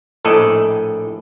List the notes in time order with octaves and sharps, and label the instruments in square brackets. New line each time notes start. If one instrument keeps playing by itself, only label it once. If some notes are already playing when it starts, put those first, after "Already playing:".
[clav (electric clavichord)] A#1 A2 A4 D5 D#5